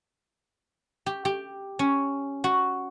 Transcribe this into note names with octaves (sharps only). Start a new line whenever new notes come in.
G4
G4
C#4
F#4